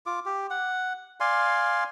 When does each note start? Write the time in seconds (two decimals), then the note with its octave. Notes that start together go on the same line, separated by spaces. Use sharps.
0.06 F4 D6
0.26 G4
0.50 F#5
1.20 D5 F5 G#5 C6